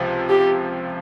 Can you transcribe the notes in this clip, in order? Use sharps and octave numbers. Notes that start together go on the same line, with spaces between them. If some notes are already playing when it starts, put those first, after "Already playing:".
Already playing: C#2 C3 F3
G4